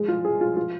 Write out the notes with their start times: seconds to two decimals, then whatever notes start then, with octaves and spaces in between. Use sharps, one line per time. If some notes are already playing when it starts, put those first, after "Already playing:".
Already playing: G#3
0.08 F4
0.25 G#4
0.41 F4
0.57 F4